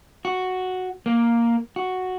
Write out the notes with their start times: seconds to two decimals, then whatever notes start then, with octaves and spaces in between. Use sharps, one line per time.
0.25 F#4
1.06 A#3
1.76 F#4